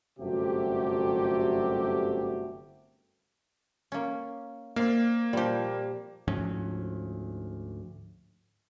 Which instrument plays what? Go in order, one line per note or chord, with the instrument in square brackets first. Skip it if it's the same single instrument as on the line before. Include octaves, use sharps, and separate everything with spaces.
[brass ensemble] G1 F#2 C3 A3 F#4 G4
[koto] A#3 C#4
[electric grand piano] A#3 [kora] C4 D5 [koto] F5
[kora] A#2 F3 [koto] G3 G4
[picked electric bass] D2 G#2 F3 C#4